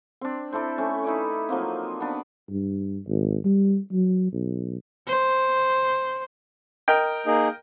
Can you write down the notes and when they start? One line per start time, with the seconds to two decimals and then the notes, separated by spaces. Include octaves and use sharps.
0.21 C4 D4
0.52 D4 E4 A4 C5
0.78 A3 C#4
1.04 D#4 E4 B4 D5
1.49 F3 F#3 A#3 C4
2.00 B3 D4
2.49 G2
3.08 G#1
3.44 G3
3.92 F#3
4.33 B1
5.08 C5
6.88 A#4 D#5 G5
7.26 A#3 D#4 G#4